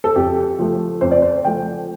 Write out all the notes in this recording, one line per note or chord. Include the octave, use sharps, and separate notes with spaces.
A4
F2 G4
F3 A3
F2 C5
D5
C5
F3 A3 G5